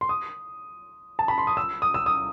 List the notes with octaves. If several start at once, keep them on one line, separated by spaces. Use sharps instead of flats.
C6
D#6
A5
B5
C6
D#6
E6
D#6
E6
D#6